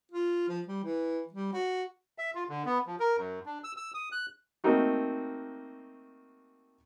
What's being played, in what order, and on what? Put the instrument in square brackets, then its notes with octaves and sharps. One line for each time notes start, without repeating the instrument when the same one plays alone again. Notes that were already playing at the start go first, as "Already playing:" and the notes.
[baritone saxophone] F4
F3
G3
E3
G3
F#4
[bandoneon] E5
F4
D3
B3
F3
A#4
F#2
D4
E6
E6
D#6
F#6
[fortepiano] A3 A#3 C4 D#4 F#4